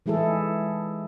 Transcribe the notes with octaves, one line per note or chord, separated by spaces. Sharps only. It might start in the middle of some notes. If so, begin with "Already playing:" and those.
E3 G#3 E4 G#4 A4